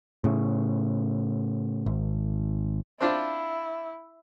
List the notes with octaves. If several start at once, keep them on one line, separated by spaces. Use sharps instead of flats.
A2 C#3
G#1
C4 D4 E4 F4